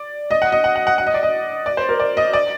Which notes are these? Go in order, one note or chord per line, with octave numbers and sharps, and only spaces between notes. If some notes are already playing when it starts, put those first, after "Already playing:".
Already playing: D5
D#5
F#5
D#5
F#5
F#5
F#5
F#5
D#5
D5
D#5
D5
C5
A#4
D5
D#5
D5